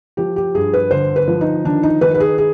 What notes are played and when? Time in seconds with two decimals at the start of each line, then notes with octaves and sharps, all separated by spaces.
0.17 F3 G4
0.36 G4
0.55 G2 G#4
0.74 B4
0.91 D3 C5
1.16 B4
1.28 F3
1.41 D#4
1.65 D#3 D4
1.83 D#4
2.01 D#3 B4
2.14 B4
2.20 G#4
2.38 G#4